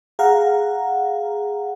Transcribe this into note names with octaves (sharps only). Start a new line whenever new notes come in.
G#4 F5 F#5 A#5